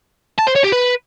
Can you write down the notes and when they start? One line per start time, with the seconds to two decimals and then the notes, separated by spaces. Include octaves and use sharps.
0.38 A5
0.47 C5
0.55 C#5
0.64 G4
0.72 B4